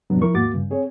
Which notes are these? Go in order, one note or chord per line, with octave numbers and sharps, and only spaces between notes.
E2 G#2 C3 F#3 B3 D4
F3 E4 A#4 C#6
D#2 G#2 A#3 F#4 D6 A6
G2 C#3
C4 G#4 C#5